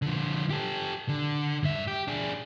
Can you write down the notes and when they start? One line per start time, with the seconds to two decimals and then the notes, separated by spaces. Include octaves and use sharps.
0.02 D3 F3
0.50 G4 A4
1.09 D3
1.63 G2 E5
1.88 G4
2.08 D4 G#4